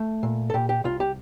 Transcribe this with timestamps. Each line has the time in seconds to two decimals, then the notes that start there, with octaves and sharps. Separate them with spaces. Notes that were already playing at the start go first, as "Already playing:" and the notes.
Already playing: A3
0.23 A#2
0.50 A4
0.54 A#2 G4
0.69 G4
0.84 C2 F4
1.00 G4